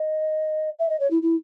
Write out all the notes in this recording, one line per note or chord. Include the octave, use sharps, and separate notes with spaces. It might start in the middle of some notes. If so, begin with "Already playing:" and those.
Already playing: D#5
E5
D#5
C#5
E4
E4